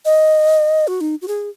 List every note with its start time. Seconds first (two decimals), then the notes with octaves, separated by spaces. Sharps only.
0.05 D#5
0.87 F#4
1.01 D#4
1.22 F#4
1.28 G#4